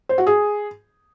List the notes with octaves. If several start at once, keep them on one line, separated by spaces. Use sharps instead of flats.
C5
F#4
G#4